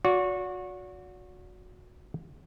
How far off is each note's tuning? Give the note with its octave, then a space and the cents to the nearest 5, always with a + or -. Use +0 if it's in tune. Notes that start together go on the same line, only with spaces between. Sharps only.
F#4 -25 D5 -40